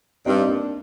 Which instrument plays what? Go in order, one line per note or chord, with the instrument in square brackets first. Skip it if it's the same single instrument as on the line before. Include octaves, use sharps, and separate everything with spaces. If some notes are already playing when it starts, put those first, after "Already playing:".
[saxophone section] G2 [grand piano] C4 D#4
[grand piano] A#3 D4